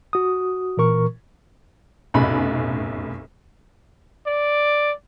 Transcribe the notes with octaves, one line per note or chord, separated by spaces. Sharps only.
F#4 D#6
A#2 E3 A#4 C#6
F1 B1 F#2 A2 B5
D5